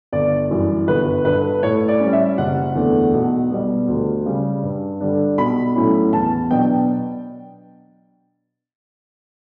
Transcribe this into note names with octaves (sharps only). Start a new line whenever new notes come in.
G1 D5
F#2 E3 G3
G1 B4
G2 D3 B4
A2 C#5
D5
G3 C#4
E5
F#1 F#5
E2 D3 A3
B1
B2 G3
D2
C#3 G3
G2
D3 G3 D4
B1 B5
A2 F#3 C#4 E4
E2 A5
B2 F#3 B3 D4 G5